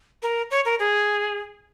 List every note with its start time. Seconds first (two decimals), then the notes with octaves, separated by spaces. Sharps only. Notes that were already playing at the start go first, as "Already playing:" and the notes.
0.23 A#4
0.51 C#5
0.65 A#4
0.80 G#4